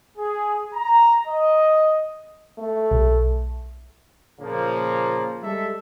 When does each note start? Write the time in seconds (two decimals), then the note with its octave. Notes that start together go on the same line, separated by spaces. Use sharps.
0.17 G#4
0.73 A#5
1.27 D#5
2.58 A3
2.91 B1
4.39 A#2 C#3 F3 A#3
5.42 G3 G#3 A4 E5